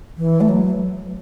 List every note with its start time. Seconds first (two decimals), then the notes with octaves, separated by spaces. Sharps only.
0.18 E3
0.41 A3
0.49 F#3